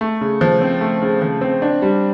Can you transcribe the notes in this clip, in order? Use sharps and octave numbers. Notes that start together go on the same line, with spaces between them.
A3
C#3
F3
C4
A3
C#3
F3
C4
D4
G3